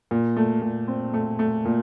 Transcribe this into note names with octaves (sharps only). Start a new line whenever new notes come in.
A#2
A3
A#2
C4
A3
A3
A#2